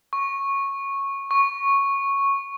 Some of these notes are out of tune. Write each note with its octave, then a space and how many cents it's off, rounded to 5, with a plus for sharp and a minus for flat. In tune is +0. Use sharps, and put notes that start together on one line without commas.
C#6 -10
C#6 -5